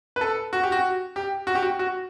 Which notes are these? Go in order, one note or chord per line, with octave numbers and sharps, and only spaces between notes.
B4
A4
F#4
G4
F#4
G4
F#4
G4
F#4
F#4